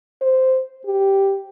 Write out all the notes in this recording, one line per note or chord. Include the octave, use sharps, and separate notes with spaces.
C5
G4